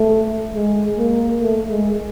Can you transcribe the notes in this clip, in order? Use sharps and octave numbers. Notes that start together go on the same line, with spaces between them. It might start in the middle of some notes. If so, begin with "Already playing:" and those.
Already playing: A3
G#3
A#3
A3
G#3